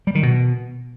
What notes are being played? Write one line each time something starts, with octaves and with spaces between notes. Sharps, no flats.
G3
D#3
B2